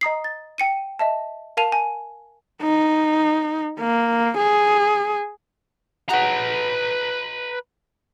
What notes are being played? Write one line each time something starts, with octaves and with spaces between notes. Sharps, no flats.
D#5 A#5 D#6 C7
A6
G5 C#7 D#7
D#5 E5 A5
A#4 F5 A5 D#7 F7
G#5
D#4
A#3
G#4
D#4 F#4 G#4 B4 A#5